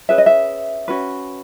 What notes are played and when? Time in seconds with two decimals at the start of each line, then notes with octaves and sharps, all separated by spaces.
0.09 C#4 G#4 B4 E5
0.18 D#5
0.26 E5
0.88 C#4 F#4 B4